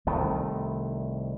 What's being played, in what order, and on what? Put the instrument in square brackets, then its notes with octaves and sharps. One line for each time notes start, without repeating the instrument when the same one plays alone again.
[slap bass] C2 D#3 A3